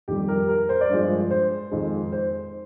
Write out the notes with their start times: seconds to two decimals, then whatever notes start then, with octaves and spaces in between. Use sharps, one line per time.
0.08 F2 D#3 G3 G4
0.28 A#4
0.49 A#4
0.69 C5
0.81 D5
0.89 G2 F3 G#3 C5
1.31 C5
1.71 F2 D#3 G#3
2.12 C5